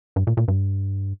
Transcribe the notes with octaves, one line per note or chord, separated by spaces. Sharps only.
G2
A#2
A#2
G2